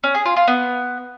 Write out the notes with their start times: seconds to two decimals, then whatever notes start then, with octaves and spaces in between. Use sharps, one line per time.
0.04 C#4
0.15 G#4
0.26 F4
0.37 F4
0.48 B3